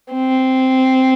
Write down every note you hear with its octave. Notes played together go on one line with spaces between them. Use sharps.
C4